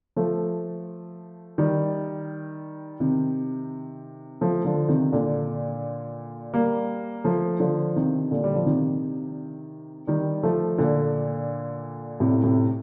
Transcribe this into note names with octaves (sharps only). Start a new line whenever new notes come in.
F3 A3
D#3 G3
C3 D#3
F3 A3
D3 F3
C3 D#3
A#2 D3
G3 A#3
F3 A3
D3 F3
C3 D#3
A#2 D3
G3
F3
C3 D#3
D#3 G3
F3 A3
A#2 D3
A2 C3
A2 C3